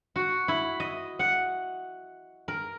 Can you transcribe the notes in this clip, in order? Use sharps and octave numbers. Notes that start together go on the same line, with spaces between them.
F#4
E4
D#5
F#5
A#4